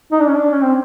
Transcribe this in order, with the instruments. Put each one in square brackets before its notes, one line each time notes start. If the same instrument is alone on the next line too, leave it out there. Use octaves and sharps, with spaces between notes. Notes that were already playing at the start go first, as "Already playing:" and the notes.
[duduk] D#4
D4
C#4
D4
C#4
C4